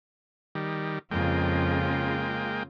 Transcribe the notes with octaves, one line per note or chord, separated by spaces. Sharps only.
D#3 G3
F2 C#3 G#3 A#3 F4 G5